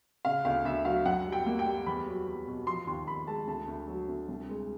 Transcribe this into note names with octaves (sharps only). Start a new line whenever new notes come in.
C#3 F5
D2 F5
D2 E5
F#3 F5
F#2 F#5
G3
G5
A#3
G5
G3
E2 B5
F#3
E2
B2
F3 C6
D#2 C6
D#2 B5
G#3 A5
D2 A5
D2
F#3
D2
C2
G#3